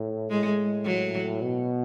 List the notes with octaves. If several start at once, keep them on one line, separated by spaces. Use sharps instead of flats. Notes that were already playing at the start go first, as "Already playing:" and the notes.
Already playing: A2
A2 G#3
F#3
B2